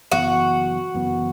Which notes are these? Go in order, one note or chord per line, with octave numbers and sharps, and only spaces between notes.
F#1 F#2 E3 B3 F#4
F#1 F#2 E3 B3